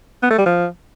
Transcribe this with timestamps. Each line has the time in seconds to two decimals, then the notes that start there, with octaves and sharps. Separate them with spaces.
0.23 B3
0.30 A3
0.38 G3
0.46 F3